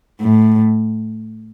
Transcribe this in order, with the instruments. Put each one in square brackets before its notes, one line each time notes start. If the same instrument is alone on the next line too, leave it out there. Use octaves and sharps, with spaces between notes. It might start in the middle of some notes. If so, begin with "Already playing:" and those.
[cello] A2